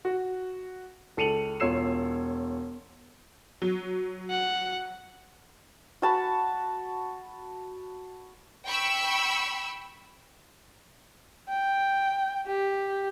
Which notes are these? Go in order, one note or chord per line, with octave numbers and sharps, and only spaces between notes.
F#4
C#2 A4 C#7 D#7 F7 F#7
E1 F4 C#5 E6 C7 E7
F#3
F#5
F#4 A5 B5
G5 B5 C#6 E6
G5
G4